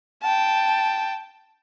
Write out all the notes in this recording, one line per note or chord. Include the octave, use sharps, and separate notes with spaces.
G5 A5